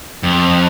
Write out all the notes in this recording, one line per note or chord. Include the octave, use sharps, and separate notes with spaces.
F2